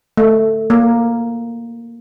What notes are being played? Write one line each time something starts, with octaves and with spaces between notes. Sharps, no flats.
A3
A#3